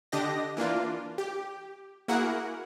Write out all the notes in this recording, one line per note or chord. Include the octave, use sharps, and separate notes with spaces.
D3 D4 G4 D#5 A#6
E3 A#3 D4 F4
G4
A#3 E4 F#4 G#4 A#4 F#5